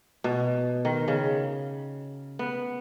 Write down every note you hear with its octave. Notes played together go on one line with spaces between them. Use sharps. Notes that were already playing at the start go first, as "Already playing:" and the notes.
B2
D#3
C#3
B3